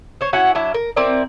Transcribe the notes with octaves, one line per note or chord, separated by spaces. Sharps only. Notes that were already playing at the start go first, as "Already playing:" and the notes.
C5 C#5
C#4 E4 F#4 F#5
F#3 D4 E4
A#4
C4 E4 A#4 D5